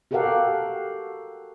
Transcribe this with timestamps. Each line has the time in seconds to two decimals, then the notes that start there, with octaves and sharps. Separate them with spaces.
0.11 F#4 G4 A4 A#4 F5 F#5